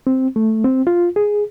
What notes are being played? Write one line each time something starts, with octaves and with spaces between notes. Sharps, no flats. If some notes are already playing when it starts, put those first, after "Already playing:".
C4
A3
C4
F4
G#4